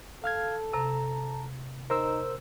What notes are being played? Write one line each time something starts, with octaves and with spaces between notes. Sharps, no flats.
A4 F5 F6 G#6
C3 A5 A#5
D#4 A#4 C5 E6